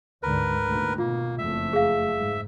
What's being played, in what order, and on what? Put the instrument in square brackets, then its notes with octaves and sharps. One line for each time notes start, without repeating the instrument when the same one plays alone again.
[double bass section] D2 G#2 D3 [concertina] A#4 B4
[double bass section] D2 A#2 D#3
[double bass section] B2 [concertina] A#3 [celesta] F4
[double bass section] F#1 F2 A3 [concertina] E5
[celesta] G#4 F5
[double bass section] G#2